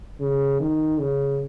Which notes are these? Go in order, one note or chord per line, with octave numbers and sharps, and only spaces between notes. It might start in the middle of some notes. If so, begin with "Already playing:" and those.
C#3
D#3
C#3